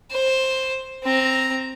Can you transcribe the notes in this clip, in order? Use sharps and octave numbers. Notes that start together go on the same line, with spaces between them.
C5
C4 A#5